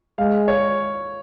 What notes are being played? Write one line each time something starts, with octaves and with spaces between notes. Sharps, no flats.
G#3 F5
C#5